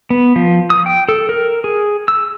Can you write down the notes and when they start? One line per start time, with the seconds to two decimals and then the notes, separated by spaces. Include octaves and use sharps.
0.10 B3
0.36 F3
0.70 D#6
0.86 G5
1.09 A4
1.29 A#4
1.64 G#4
2.08 E6